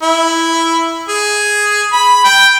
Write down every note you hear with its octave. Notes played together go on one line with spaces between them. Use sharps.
E4
G#4
B5
G5